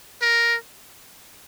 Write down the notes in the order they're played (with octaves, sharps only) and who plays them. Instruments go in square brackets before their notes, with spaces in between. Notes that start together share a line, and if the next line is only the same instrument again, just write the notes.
[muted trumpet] A#4